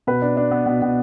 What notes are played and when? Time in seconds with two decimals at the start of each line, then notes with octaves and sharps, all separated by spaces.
0.07 B2 B4
0.22 D4
0.37 D4
0.51 B3
0.66 B2
0.82 B2